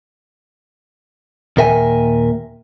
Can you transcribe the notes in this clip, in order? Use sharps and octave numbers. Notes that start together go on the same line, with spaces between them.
D#2 A#2 A#4 E5 G5 G#5